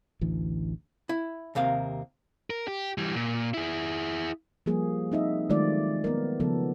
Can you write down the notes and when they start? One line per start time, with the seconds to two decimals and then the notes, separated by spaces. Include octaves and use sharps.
0.21 A1 D2 E3
1.09 E4
1.55 D#2 C3 A#3 F5
2.50 A#4
2.68 G4
2.98 E3 G3
3.16 A#2
3.54 E4 G#4
4.66 F3 G3 A#3 G#4
5.12 C4 D#4 D#5 E5
5.50 D#3 F#3 G#3 A3 F4 D5
6.04 B3 A#4
6.40 C#3 F3 B3 A4